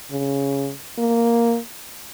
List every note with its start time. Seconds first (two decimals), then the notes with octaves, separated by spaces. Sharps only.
0.12 C#3
0.98 A#3